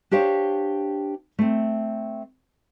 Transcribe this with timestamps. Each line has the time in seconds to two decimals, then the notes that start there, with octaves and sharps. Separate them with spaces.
0.11 D4 G4 C5 C#5 F5 G5
1.39 A3 C4